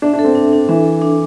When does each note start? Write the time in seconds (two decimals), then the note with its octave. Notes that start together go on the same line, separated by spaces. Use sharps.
0.02 D4 E5
0.14 D4
0.19 A4
0.24 C4
0.35 D4
0.53 D4
0.69 E3 E5
0.86 A4
1.02 D4